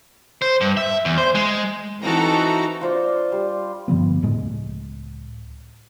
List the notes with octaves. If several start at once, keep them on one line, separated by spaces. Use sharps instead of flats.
C5
G2
E5
E2
C5
G#3
E3 C4 D#4 F#4 A4 A#5
F4 C5 D5 F5
G3
G2 D3 F3 B3
C#2 A2 G#3